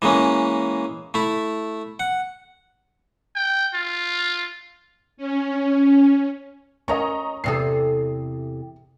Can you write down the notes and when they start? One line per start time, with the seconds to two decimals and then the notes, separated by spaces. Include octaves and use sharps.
0.02 E3 G#3 A#3 C#4
1.14 A3 E4
2.00 F#5
3.36 G5
3.74 F4
5.17 C#4
6.88 C#4 A#4 D#5 A#5 C#6
7.44 E2 C3 A4 D#6 C7